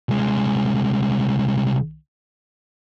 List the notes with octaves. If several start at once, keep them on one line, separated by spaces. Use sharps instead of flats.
C2 G#3